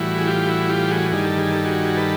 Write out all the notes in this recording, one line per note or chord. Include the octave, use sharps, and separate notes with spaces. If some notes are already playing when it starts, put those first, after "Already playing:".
Already playing: A2 E3 G3 E4 F#4
G#4
F4 G4
E4 F#4
F4 G4
F#4 G#4
G2 D#3 G3 G#4
A4
G#4
A4
F#4 G#4
A4 B4